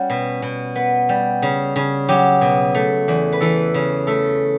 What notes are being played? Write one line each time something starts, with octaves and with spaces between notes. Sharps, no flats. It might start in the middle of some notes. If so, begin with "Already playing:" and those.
Already playing: G3 C#4 F#4
B2
B2
B3
G3
C#3
C#3
F#3 G4
B2
A3
E2
B4
E3 A4
C#3
A3 A4